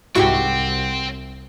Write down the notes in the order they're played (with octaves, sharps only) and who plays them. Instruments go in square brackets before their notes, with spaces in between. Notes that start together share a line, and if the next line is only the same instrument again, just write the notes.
[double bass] C2 [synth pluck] G#2 E4 C#6 [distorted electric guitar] C4 [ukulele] F#4 G4